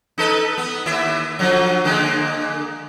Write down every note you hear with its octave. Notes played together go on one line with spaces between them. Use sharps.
D#4 A4 B4
B3
D#2 E4 E5
D3 F3 F#3
D3 G#3 A#3